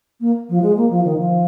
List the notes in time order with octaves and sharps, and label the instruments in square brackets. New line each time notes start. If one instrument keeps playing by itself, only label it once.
[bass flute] A#3
F3
G#3
A#3
F3
D#3
F3